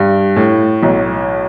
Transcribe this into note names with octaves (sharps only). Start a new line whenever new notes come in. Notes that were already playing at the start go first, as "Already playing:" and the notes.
Already playing: G2
A2
B1